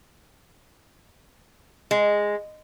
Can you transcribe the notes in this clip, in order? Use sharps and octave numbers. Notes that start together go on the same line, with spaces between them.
G#3